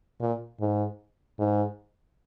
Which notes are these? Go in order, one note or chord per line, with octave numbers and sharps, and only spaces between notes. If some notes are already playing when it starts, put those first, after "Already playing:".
A#2
G#2
G#2